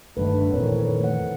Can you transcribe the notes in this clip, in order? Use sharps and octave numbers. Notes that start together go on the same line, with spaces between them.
F1 G2 D3 D#3 A3 B4
F2 A#2 D#3 E3 C4 A4 A#4 C#5
A3 F#5